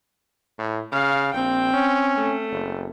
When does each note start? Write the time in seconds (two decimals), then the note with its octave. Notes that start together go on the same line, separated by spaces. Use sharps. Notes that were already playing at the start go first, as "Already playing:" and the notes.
0.59 A2
0.92 C#3 F5
1.34 A#1 C4 G5
1.74 C#4
2.17 A3
2.51 F#1